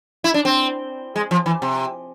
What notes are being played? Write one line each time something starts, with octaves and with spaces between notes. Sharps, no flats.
E4
D4
C4
G#3
F3
E3
C3